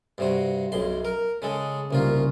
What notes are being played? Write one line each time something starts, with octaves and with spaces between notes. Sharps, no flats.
G2 C3 F#4
B1 F#2 C6
A#4
C#3 G#3 A4
C2 C#3 A#3 F4